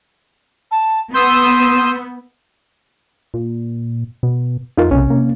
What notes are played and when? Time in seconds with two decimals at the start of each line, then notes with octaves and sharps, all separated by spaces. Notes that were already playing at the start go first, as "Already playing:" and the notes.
0.71 A5
1.14 B3 C6 D#6 E6 G6
3.34 A#2
4.23 B2
4.77 F2 D#4 F4 A#4
4.91 B1 C3 C#4
5.10 A#3